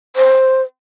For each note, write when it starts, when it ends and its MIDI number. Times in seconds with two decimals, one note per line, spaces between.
0.16 0.61 72